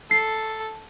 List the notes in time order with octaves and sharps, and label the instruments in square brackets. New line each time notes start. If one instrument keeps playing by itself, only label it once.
[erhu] A4 [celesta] C7